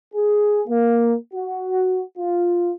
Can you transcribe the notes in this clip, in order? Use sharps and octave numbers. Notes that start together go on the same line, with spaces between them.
G#4
A#3
F#4
F4